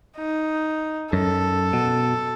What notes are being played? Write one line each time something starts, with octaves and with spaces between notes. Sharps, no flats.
D#4
F#2 A4
B2